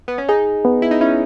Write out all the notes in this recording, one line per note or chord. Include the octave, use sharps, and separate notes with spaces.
B3
C#4
D#4 G#4
B3
E4
D#4
C#4 E4